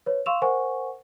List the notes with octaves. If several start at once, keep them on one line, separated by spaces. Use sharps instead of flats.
B4 C#5
F5 C6 C#6 E6 E7 F7
A#4 C5 F#5 G#5 C#6